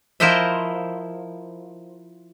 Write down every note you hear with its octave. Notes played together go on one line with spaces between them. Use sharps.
F3 E4 A#4 C5 D#5 E5